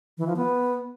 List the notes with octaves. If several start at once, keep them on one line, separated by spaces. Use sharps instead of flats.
E3
F3
B3